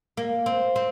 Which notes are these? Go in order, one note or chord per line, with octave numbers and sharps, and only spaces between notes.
A#3
C4
C4